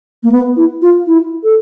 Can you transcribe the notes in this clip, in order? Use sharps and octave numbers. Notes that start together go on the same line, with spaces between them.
A#3
B3
E4
F4
E4
A4